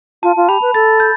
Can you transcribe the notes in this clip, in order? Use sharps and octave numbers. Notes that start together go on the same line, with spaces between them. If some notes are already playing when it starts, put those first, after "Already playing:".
F4 A5
F4
G4 B5
B4
A4 A6
G6